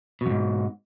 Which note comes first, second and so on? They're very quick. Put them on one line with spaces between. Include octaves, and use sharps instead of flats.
B2 F2 G#2